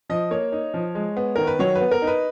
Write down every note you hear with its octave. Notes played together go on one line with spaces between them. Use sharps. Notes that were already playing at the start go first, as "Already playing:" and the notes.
F3 D#5
A#3 C#5
D#4
F3
G#3
B3
D#3 A#4
B4
F#3 C#5
B4
B3
A#4
D#4
B4